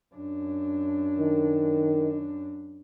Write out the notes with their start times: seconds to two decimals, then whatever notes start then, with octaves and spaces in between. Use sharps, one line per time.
0.15 F#2 D4
1.19 D#3